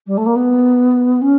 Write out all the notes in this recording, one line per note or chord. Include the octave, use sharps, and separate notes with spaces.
G3
A3
A#3
B3
C#4